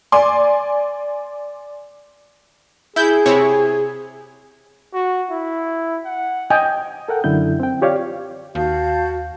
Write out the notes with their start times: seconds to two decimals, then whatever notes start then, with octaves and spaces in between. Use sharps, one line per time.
0.12 D5 G#5 C6 D6
2.96 E4 G#4 G6
3.26 C3 E4 C#5
4.93 F#4
5.30 E4
6.05 F#5
6.50 D#5 G5 G#5
7.09 A4 A#4 F#5 G5
7.24 F#2 D3 E4 G6
7.60 C4 G5
7.82 F4 G4 C#5 D5 F5
8.55 D#2 F#4 F5 A5 G6